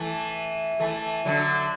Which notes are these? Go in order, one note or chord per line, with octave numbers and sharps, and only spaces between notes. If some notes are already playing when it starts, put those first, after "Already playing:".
Already playing: E3 A3
E3 A3
D3 F#3